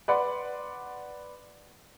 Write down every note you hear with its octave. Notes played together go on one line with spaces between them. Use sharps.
B4 D5 F#5 B5 C6